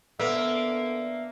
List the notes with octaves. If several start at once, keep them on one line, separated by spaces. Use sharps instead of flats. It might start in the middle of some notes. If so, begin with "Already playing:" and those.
D3 A#3 B3 E5